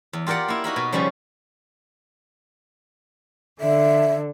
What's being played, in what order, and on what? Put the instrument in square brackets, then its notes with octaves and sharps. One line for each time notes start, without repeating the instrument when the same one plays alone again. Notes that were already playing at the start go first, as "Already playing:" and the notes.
[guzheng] E2
F4 G4 A#4 D5 F#5
A#3 E4
D#4 F#4 A#4 B5
B2
C#3 F3 G3 B3 C#4
[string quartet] D3 [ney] E5